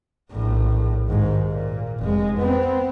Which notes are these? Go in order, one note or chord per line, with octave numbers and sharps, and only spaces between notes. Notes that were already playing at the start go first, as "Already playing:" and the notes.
A#1 A2
D#2 G#2
A#2
F1 G#3
B3 C4